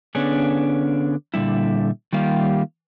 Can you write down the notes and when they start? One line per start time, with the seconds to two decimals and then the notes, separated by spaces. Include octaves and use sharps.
0.15 D3 B3 C#4 D4 G#4
1.34 A#2 D3 G3 E4
2.13 D#3 G3 A#3 F4 G4